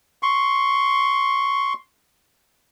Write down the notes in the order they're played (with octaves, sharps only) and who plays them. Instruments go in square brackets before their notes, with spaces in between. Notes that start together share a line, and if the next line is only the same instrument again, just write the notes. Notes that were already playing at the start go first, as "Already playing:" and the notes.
[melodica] C6 C#6